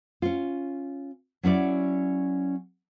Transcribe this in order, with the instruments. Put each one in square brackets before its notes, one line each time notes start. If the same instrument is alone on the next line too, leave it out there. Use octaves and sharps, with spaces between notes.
[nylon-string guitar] C#4 F4
F#3 C#4 E4 D5